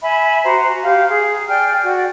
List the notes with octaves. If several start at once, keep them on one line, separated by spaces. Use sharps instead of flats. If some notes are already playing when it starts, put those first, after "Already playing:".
E5 G#5 B5
F#4 C5 A#5
G4 F5
G#4
D5 G5 G#5 F6
F#4 D5